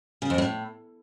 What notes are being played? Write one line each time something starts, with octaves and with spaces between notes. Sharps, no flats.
C#3
F2
A2